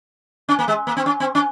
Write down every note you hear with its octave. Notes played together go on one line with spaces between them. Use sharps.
C#4
A#3
G#3
A#3
C4
C#4
C4
C#4